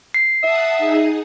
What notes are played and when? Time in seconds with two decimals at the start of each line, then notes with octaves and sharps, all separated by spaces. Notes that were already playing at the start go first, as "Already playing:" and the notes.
0.14 C7
0.44 E5 F#5 A5 D#6
0.78 D#4 G#4